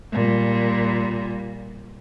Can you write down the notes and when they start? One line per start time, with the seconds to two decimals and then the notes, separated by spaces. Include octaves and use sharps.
0.13 A#2 G3